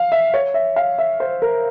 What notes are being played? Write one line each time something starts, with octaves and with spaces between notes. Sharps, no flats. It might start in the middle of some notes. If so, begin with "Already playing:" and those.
Already playing: F5
E5
C#5
E5
F5
E5
C5
A#4